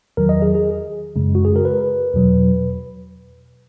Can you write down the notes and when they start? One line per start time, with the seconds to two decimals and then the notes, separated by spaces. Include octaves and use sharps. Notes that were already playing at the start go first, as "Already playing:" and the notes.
0.17 E2 D#3 F#3 A#4
0.29 D#5
0.42 G#4
0.55 G#4
1.16 F#2 C#3 G#3
1.35 F#4
1.45 G#4
1.56 A#4
1.65 B4
2.14 E2 B2 F#3